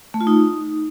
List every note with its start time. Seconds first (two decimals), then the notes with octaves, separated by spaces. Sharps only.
0.14 A3
0.21 F4
0.27 D#4